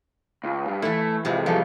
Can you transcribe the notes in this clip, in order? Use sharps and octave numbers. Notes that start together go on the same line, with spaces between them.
C#2
G2
E3 A3 E4
F2 C3 G#3
F3 G3 A4